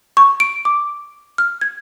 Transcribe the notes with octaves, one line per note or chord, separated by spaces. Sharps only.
C#6
D7
D6
F6
G#6